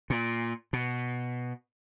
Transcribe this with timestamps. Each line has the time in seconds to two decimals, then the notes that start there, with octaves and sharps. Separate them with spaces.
0.10 A#2
0.73 B2